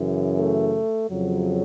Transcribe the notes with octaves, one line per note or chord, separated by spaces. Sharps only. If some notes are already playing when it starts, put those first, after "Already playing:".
Already playing: F#2 C#3 E3
A3
F2 C#3 F#3